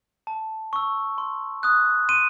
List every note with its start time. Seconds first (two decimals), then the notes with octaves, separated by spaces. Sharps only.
0.27 A5
0.73 C#6 E6
1.18 C6
1.63 D#6 F#6
2.09 C6 D#7